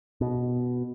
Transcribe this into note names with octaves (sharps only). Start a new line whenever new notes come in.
B2